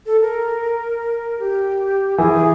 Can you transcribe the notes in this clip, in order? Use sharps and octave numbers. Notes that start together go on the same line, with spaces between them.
A4
A#4
G4
E3 G#4